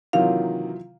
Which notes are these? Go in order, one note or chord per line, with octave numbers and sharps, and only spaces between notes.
C3 D#3 E3 F#3 A#3 F4 F5